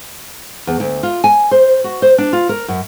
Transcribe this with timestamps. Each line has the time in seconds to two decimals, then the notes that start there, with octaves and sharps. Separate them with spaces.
0.67 E2
0.80 D2
1.03 F4
1.24 G#5
1.51 C5
1.84 F#4
2.02 C5
2.18 D4
2.33 F4
2.49 A#4
2.68 F#2